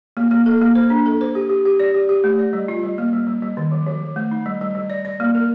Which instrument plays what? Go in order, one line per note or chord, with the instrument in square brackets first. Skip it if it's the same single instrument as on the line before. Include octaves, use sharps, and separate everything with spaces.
[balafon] A#3
A#3
A4
A#3
C5
D4
A4
C5
G4
G4
G4
D5
G4
G4
A3
D5
G3
F4
G3
A#3
G3
G3
G3
D#3
F3
F3
F3
A3
D#4
G3
G3
G3
D5
D5
A#3
A#4